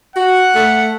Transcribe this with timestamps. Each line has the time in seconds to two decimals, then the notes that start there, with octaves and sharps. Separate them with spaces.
0.16 F#4 F#5
0.55 A3